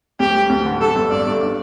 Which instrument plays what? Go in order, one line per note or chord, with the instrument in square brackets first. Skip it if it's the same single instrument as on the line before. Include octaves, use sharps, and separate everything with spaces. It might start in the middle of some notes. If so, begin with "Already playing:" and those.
[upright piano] D2 [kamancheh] G4
[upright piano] G3
D2
D3
[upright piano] G3 [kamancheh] A4
[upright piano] G1
[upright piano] G2 [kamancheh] D5
[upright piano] G2
D4